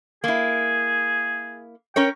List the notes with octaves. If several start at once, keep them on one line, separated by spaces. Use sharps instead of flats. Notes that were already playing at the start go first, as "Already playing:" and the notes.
A#3 E4 G#4
C#4 A#4 C#5 G5